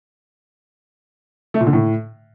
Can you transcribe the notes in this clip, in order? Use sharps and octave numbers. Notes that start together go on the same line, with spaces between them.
A3
A#2
D3
A2